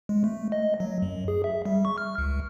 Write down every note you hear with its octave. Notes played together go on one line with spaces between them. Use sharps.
G#3
A3
D#5
F#3
F#2
G#4
E5
G3
C#6
F6
C#2